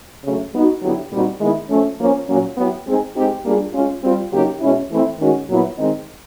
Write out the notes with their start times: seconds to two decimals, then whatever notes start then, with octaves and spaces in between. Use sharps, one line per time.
0.24 C#3 F#3 A3
0.53 G3 B3 D#4 F#4
0.82 D3 F#3 B3 E4 G4
1.11 A#2 G3 C4 D#4 F#4
1.40 D#3 G#3 B3 E4
1.70 F3 A3 C#4
1.99 F3 A#3 C#4
2.28 A#2 F#3 A#3 C#4
2.57 F#3 B3 E4 G4
2.86 G#3 C4 D#4 G#4
3.15 G#3 C4 D#4 G4
3.45 G3 A#3 D4 F4 G#4
3.74 G#3 C#4 F4
4.04 G3 C4 F4
4.33 C#3 F#3 A#3 D#4 G4
4.61 B2 G#3 C#4 E4
4.90 E3 A3 C4 E4
5.19 D#3 G#3 C#4 F#4
5.49 A#2 F#3 B3 E4
5.78 D#3 G#3 C4 D#4